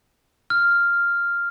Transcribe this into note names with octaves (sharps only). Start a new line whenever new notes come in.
F6